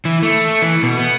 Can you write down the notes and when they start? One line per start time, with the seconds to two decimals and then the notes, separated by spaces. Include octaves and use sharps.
0.05 E3
0.23 A3
0.62 E3
0.83 B2
0.97 B3